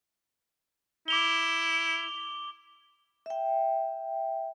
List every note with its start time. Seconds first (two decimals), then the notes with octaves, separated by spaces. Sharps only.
1.08 E4 D6 F7 G7
3.26 E5 G5